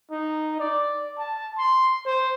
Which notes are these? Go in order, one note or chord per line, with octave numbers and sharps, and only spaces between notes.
D#4
D5
A5
C6
C5